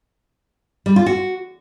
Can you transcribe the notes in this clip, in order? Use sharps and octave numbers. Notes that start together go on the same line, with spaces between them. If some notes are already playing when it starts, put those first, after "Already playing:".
G3
F4
F#4